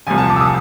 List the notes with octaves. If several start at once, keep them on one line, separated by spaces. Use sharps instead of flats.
C2 C3 F3 G#5
A5
D6
E6
D#6